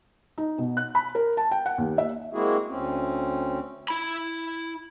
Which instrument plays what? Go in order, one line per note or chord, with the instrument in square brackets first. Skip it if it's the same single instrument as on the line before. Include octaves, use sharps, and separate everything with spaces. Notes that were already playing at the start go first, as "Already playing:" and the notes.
[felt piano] D#4
B2
F#6
B5
A#4
A5
G5
F#5
D#2
E5
[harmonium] G#3 A#3 C4 E4 F#4 G#4
D2 C4 C#4
[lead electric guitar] E4 B5